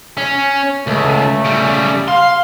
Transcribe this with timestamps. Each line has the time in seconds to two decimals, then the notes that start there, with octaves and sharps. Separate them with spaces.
0.17 C#4
0.87 C#2 A3
1.45 C#3 G3
2.08 F5 C6